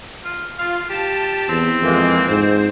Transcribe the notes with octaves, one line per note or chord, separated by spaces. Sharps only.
F4
F4 F5
G4 A5
E2 C4
F2 E3 G#3 A#3
G#2 C5